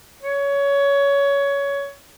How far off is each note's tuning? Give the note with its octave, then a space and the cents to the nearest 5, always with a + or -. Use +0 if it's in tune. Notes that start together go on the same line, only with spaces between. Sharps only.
C#5 +20